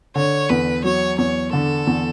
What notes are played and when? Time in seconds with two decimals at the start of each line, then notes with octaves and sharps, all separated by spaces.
0.15 D3 C#5
0.49 E2 B4
0.84 F#3 C#5
1.18 E2 C#5
1.53 D3 A4
1.87 E2